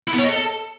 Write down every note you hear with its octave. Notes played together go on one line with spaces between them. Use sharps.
E4
B3
C#5
D#5
A4